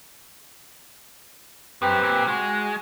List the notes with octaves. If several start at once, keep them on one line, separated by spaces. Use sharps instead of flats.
F#2 C4 G4 B4
A#2
G#3 F#4